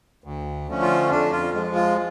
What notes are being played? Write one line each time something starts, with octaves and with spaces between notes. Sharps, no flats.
D2
D3 F3 A3 C#4
F4
F2 D4
F4
F3 G#3
F4